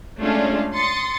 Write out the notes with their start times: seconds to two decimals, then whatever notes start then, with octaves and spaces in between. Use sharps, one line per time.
0.20 G#3 A3 C#4 D4 F4
0.74 C6 D#6 A6 C#7